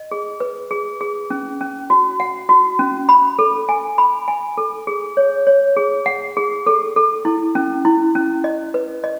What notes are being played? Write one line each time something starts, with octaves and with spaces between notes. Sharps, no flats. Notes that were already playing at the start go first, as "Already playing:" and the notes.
Already playing: D#5
G#4
B4
G#4
G#4
C#4
C#4
F#4
F#5
F#4
C#4
B5
A4
G#5
B5
G#5
A4
G#4
C#5
C#5
G#4
F#5
G#4
A4
A4
E4
C#4
E4
C#4
D#5
B4
D#5